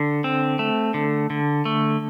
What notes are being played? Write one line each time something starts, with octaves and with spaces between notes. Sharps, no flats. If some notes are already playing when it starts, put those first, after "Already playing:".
Already playing: D3
C4
A3
D3
D3
A3